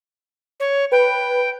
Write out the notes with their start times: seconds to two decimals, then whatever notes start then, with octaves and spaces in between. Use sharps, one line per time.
0.60 C#5
0.92 B4 G5